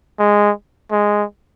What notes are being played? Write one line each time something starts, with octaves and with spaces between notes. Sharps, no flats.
G#3
G#3